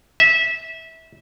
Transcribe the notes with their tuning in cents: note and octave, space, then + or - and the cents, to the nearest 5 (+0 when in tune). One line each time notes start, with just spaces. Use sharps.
E5 -20